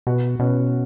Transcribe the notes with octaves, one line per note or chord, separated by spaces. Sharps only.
B2 F#4
B2 C#4